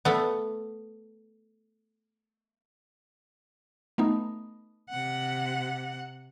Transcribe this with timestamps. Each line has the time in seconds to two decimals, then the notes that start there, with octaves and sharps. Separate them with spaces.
0.05 A3 B3
3.98 A3 B3 D#4
4.90 C3 F#5